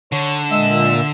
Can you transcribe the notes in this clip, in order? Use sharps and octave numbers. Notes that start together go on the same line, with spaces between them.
D3 C#5
A#2 G#3 E5 E6